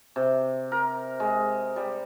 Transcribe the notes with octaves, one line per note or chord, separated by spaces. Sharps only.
C3
A#4
G#3
G3